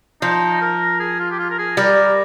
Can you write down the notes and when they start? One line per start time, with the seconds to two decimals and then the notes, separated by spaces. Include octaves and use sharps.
0.22 F3 D#4
0.61 A#4
1.00 G#4
1.20 F4
1.31 G4
1.39 F4
1.50 A#4
1.58 G#4
1.77 G3 A#4